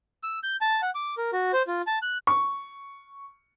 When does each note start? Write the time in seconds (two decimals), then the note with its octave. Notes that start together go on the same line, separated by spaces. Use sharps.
0.23 E6
0.43 G6
0.61 A5
0.82 F#5
0.95 D6
1.17 A#4
1.33 F#4
1.53 C5
1.67 F4
1.87 A5
2.02 F#6
2.27 C#6